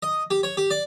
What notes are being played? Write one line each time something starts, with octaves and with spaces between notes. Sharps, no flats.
D#5
G4
C#5
G4
D5